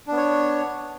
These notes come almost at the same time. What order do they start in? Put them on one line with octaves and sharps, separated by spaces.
D4 B3 C#5